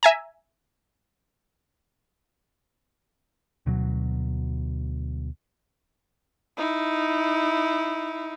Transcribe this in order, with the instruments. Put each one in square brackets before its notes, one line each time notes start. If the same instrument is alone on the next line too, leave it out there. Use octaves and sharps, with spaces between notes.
[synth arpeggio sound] E5 G#5 A#5
[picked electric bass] D2 B2 F#3
[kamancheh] D#4 E4